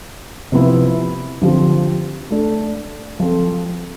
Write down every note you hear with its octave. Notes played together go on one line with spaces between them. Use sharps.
C3 F3 B3 E4
D3 F3 C4 G4
A3 D4 A4
F3 C4 F4 A4